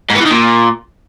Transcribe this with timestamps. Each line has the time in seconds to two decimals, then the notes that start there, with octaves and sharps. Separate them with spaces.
0.10 G#2
0.15 B3
0.21 E3
0.26 D#3
0.31 A#2